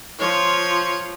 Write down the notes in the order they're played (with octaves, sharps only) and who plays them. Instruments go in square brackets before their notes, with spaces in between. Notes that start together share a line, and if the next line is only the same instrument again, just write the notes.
[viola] F3 F4 [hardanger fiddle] C#5